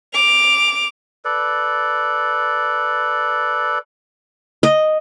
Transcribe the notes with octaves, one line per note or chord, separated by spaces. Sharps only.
D6 F7
A4 B4 D5
D#5